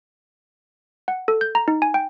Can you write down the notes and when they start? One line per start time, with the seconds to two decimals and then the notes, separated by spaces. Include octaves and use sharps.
1.08 F#5
1.28 A4
1.41 G6
1.55 A#5
1.68 D#4
1.82 G#5
1.94 G5